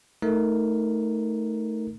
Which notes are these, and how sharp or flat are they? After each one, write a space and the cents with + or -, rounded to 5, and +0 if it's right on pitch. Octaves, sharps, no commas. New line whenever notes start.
A3 +0 D#4 +20 A#4 +0